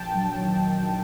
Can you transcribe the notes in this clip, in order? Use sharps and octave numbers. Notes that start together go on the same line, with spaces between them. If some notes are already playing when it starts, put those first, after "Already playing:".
Already playing: A#1 G5 A5
F#3 G5 A5
D#3
A#1